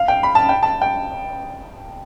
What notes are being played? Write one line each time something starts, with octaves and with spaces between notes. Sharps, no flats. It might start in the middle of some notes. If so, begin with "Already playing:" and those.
Already playing: F5
G5
B5
A5
G5
A5
G5